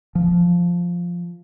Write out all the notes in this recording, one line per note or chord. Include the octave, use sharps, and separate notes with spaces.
F3